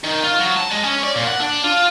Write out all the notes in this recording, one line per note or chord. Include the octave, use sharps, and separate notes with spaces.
D#3
F4
F#3
A5
G#3
C#4
D5
A#2
F#5
D4
F4